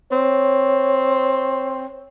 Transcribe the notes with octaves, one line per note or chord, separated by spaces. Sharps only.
C4 C#5